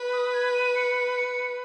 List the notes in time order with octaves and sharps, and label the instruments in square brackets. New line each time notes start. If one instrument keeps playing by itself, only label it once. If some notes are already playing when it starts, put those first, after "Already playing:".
Already playing: [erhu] B4
[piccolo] D#6
G#6
D#7
C#7
C#7